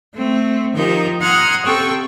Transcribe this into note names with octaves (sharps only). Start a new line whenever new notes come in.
A3 C4
D#3 F3 D#4 G4 A#4 G6
F#5 A#5 C6 D#6 F6 G#6
C3 C4 A4 G5 C#6